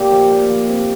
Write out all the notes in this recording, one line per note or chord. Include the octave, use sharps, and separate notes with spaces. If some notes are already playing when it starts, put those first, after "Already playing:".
Already playing: A#2 G4
F3
A#2
F3
C3